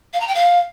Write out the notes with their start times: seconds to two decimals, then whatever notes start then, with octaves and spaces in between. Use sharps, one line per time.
0.13 F5
0.20 A#5
0.28 G5
0.35 F5